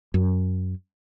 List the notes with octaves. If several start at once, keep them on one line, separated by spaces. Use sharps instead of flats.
F#2